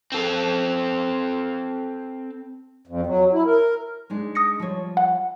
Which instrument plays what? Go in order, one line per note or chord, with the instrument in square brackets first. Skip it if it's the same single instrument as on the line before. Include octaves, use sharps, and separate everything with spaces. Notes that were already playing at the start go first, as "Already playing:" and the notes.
[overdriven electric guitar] C4 A4
[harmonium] F2
F#3
E4
A#4
[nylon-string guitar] G#3 D4 D#4
[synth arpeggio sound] D#6 A#6 C#7
[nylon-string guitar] F3 G3 C#5
[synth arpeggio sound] F#5